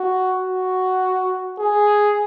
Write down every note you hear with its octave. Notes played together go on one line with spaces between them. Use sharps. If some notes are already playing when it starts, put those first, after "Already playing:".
Already playing: F#4
F#4
G#4